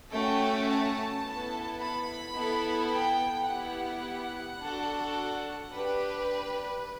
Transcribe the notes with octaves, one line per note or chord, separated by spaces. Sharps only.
A3 C#4 F#4 A4 G5
A5
B3 E4 A4
B5
B3 E4 A4
G5
B3 E4 G4 F#5
D4 F#4 A4
D4 G4 B4